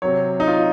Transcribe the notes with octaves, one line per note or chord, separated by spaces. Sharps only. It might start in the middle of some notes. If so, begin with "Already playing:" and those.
C3 F#3 C#5
D#4
F4